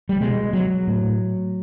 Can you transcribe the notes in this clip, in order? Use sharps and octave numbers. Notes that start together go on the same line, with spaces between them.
G3
B2 G#3
F#3
A2